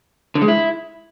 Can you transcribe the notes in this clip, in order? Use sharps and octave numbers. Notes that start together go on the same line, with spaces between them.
D3
G#3
E4